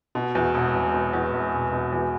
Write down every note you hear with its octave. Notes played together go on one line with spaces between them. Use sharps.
B2
E2
E1
E1
B2
E2
E1
E1
B2
E2